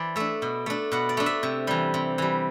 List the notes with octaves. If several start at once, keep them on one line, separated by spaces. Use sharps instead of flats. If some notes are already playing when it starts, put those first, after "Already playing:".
Already playing: E3 C5 D5
A3 D4 E5
B2
A3 D4
B2 F#5
D5
A3 D4
E5
C3
E3 G3
C3
E3 G3